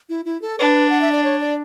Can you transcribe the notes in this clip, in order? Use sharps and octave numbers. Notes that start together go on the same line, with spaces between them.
E4
E4
A4
D4 B4
F#5
E5
D5
C#5
D5